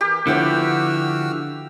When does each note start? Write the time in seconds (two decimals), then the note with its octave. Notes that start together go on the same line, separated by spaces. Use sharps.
0.01 E3 G4 A#4
0.27 D3 F3 B3 E4 F#4 E6 F6